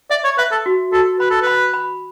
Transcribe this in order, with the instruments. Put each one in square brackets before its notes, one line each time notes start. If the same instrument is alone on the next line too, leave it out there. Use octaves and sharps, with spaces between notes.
[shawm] D5 [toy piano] E5
[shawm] C#5
[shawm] B4 [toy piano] E5
[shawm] A4
[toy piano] F#4
[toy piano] F#4 [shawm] A4
[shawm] B4 [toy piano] B5
[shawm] A4
[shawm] B4 [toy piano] B5
[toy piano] B5